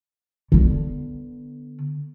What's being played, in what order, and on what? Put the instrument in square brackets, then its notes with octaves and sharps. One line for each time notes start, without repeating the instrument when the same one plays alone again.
[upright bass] D3 B3